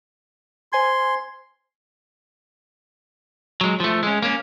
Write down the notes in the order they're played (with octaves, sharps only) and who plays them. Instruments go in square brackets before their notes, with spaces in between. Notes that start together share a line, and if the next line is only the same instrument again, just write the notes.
[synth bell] C5 G#5 G#6 [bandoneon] C6
[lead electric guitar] F#3 G#3
F3 A3
G#3 C#4
A#3 C#4